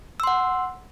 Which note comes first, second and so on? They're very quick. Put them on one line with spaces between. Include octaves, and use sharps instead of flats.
E6 C6 F#5